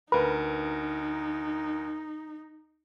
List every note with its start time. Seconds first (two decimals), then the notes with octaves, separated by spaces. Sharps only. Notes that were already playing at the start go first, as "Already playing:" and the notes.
0.12 D2 D#4 A#4 B4